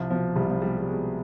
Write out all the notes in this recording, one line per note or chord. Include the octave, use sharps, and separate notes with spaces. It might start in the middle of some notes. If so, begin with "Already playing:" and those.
Already playing: C2 F3
B2 F3
C2 G3
F3
B2 G3
G3
B2 G#3